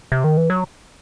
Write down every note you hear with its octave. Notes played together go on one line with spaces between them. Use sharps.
C3
D#3
E3
F#3